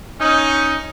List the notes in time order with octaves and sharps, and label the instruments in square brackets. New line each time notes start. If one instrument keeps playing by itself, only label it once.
[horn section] C#4 D#4